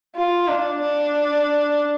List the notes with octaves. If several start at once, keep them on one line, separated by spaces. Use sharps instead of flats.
F4
D4
D4